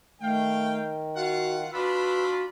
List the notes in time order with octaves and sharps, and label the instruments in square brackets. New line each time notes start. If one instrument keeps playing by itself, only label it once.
[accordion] D#3 [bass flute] A3 [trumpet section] F5 G5
[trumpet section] F4 F5 F#5 [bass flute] F#4
[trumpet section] D4 F4 B5 [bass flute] F#4 [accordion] B4 E6